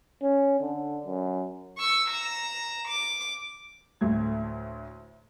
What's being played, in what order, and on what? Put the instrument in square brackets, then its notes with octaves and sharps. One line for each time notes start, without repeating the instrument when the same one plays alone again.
[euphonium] C#4
D3
F#2
[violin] C#6 E6
A#5 E7
D6
[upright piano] D2 A2 A3 G#6